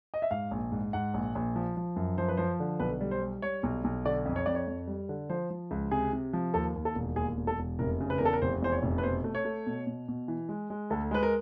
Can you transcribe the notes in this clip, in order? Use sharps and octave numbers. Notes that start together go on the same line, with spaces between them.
D#5
E5
G#2 F5
A#1
G#2
G#2 F#5
A#1
A#1
F3
F3
F#2
F3 C5
B4
F3 C5
D3
B1 B4
G3
C5
G3
G3 C#5
B1
B1
D3 D5
F2
C#5
F2 D5
C#5
F2
G3
D3
F3 C5
F3
C#2
C3 G#4
C3
F3
D#2 A4
D#2
A4
E1
D#2 G#4
E1
A4
E1
F1 A#4
C#3
B4
E2 A#4
A4
A#4
F1 C5
E2 C5
C#5
F1
B4
B2 C5
A3
C#5
A3
B2
B2
B2
E3
G#3
G#3
D2 A4
G#3 B4
A#4